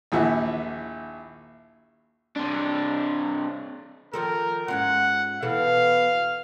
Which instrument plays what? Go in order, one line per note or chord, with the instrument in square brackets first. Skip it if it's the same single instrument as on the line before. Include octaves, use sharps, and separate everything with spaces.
[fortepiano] A#1 D#2 E4 F#5
[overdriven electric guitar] C3 D4
[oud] D#3 F3 A4 [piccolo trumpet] A#4
[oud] G#2 C#4 F4 [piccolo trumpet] F#5
[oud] B2 E3 A4 [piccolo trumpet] F5